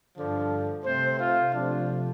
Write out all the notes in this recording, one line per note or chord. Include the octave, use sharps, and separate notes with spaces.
G2 D3 F3
C3 A3 C4 C5
F4
C3 F3 A3 D4